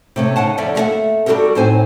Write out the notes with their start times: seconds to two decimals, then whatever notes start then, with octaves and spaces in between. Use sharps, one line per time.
0.16 C3 A3 C#4
0.36 C#3 D#4 F#5 A5
0.58 F2 D3 C#4 D5 E5
0.75 A3 A#3 F4 G#4 E5 F#5
1.26 G3 D4 F#4 G4 A4 A#4
1.55 A2 C4 D#4 C5 G#5